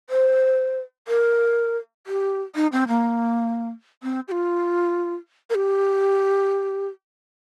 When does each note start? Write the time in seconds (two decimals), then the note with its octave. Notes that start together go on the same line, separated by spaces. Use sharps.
0.10 C5
1.08 A#4
2.07 G4
2.56 D#4
2.72 C4
2.88 A#3
4.03 C4
4.28 G4
4.32 F4
5.50 A#4
5.55 G4